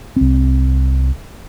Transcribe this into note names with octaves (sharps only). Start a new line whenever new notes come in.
C2 C4